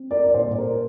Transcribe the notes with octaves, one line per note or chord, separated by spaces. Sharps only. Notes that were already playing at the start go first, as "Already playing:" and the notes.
Already playing: C4
A#4 D5
D5
A#2 C5
A#4